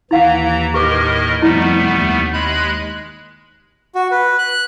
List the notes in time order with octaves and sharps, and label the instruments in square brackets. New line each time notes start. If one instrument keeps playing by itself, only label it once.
[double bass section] D#2 [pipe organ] E3 A#5 [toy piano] E4 F5 F#5
[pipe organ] A2 A#4 D#5 [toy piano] G4 B4 D6
[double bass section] F2 C3 [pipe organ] G3 A3 B3 [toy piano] E4
[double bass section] D#2
[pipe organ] G#3 B5 F#6
[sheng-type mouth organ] F#4
B4
F#6